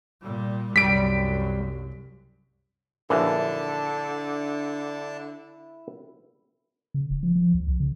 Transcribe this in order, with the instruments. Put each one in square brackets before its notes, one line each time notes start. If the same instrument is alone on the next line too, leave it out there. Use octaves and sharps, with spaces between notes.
[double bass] A#2 G3
[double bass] C2 F#2 [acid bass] G3 [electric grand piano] B6 D7
[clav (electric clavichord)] A#1 F#2 E3 [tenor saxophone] D3 [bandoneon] D4 A5 [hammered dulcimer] E4
[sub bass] C#3
E1
F3
F3
D2
C2
C#3